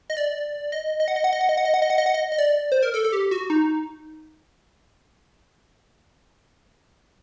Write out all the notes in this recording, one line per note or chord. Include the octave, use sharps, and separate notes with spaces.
D#5
D5
D#5
D#5
F#5
D#5
F#5
D#5
F#5
D#5
F#5
D#5
F#5
D#5
F#5
D#5
F#5
D#5
D#5
D5
C5
A#4
A4
A4
G4
F#4
D#4